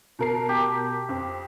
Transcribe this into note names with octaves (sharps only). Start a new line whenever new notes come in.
B2 A#4 C7
G4
F2